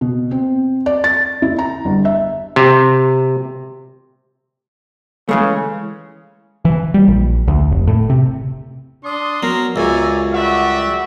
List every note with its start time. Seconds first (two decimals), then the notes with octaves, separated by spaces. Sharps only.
0.01 B2
0.31 C4
0.86 D5
1.04 A6
1.42 E4
1.59 A#5
1.85 G1
2.05 E5
2.56 C3
5.29 C#3 E3 G#3 A3
6.65 E3
6.94 G3
7.08 A#1
7.48 D2
7.71 F1
7.87 A2
8.10 C3
9.04 D4 C6 D#6
9.43 F#3 B3 A#4
9.76 C#2 F#2 D5 G#5 A#5 C#6 E6
10.33 G3 F#4 D5 E5 F#5